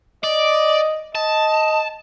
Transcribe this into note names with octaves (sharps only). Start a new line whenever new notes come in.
D5 D#5
D#5 A5